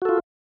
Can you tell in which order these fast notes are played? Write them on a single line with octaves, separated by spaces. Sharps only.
F#4 A4 F4